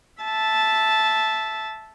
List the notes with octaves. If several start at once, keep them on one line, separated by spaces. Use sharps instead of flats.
E5 A5